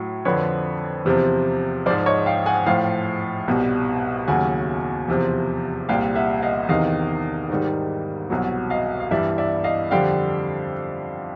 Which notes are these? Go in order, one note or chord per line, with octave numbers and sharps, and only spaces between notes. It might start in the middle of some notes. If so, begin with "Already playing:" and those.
Already playing: A2 F#3
F2 D3 F3 B4 C#5
E2 C3 F3
G#2 F3 C5 D5
C#5 D#5
F5 G5
F#5 G#5
A2 F3 F5 G5
C2 B2 G3
D#2 C#3 F#3 F#5 G#5
E2 C3 F3
C2 A#2 G3 F5 G5
E5 F#5
D#5 F5
E2 C3 D#3 D#5 F5
G#2 D#3 G3
C2 B2 F#3
D#5 F5
F5
G2 E3 G3 D5 E5
D5 E5
D#5 F5
F2 D3 G3 F5 G5